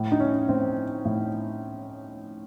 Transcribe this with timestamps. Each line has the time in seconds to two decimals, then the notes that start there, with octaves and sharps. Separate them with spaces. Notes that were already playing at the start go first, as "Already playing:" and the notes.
Already playing: A2
0.12 D#4
0.20 C#4
0.48 A2 C4
1.05 A2